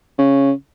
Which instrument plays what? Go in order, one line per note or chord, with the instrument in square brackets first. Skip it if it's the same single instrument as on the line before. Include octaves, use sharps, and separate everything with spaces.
[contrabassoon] C#3